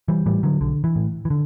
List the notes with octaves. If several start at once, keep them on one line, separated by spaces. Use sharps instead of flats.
E3 G3
A2 E3 G3
D3 F#3
B1 D3
E3
A2
E3
D3